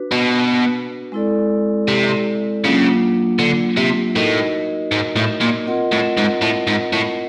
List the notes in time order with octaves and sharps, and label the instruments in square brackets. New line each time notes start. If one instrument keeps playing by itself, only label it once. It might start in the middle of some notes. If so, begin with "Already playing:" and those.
Already playing: [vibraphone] D4 F#4 B4
[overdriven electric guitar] B2
[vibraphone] G#3 C4 E4 A4 D5
[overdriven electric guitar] C3
[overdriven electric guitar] C#3 [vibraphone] F#3 A#3 D4 F4
[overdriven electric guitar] D3
C3
[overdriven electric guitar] A2 [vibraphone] D#4 F#4 A#4 D#5
[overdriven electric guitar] G#2
A2
A#2
[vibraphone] C4 F4 A#4 D#5 F#5
[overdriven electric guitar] A2
G#2
A2
G#2
A2